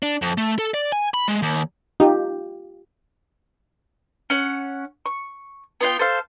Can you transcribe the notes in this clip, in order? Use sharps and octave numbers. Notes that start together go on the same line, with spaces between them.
D4
F2
A3
A4
D5
G#5
B5
G#3
D#2
D#4 F4 G4
C#4 F#5
C#6
B3 F4 G5
A4 C5 F5